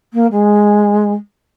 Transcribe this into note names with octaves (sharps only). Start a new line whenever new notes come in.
A#3
G#3